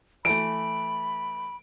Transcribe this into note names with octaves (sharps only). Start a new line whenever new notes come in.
E3 A3 B5 D7